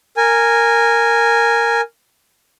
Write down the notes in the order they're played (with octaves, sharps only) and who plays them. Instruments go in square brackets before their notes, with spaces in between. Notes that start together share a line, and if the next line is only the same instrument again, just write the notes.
[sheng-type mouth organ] A#4 G#5